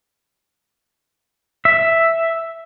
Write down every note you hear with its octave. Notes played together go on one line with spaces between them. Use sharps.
E5